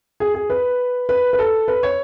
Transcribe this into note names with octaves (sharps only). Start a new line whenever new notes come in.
G#4
G#4
B4
B4
B4
A4
B4
C#5